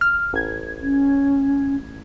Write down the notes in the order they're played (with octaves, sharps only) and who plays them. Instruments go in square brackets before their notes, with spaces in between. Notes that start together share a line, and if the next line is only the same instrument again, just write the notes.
[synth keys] F6
A1 G#6
[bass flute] C#4